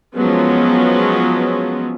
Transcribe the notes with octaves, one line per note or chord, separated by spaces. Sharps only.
F3 F#3 G#3 B3 C#4